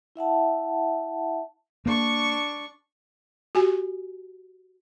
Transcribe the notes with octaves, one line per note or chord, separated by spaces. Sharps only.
E4 E5 F#5 A5
A#3 D4 C#6
F#4 G4 G#5